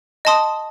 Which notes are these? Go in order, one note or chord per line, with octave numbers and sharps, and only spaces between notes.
D#5 A5 C6 D#6